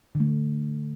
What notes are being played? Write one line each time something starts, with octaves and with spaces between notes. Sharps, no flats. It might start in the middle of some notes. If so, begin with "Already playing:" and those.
D3
A3